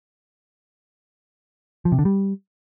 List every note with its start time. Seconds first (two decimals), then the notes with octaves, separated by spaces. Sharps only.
1.85 F3
1.92 C3
1.99 D3
2.05 G3